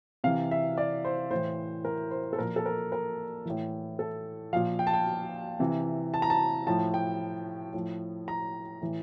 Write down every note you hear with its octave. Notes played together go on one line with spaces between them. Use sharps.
C3 E3 F5
E5
D5
C5
A2 E3 C5
A#4
C5
A4
A#2 F3 A#4
A4
A#4
A#4
A2 E3
A4
A#2 F3 F5
G5
A5
G5
C3 E3
A5
A#5
A5
A2 F3 A5
G5
A2 F3
A#5
A2 E3